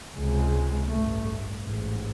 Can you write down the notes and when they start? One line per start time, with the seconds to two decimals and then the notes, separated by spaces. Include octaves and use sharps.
0.16 C#2 C3 G#3
0.91 A1 G2 A3
1.64 A1 G#2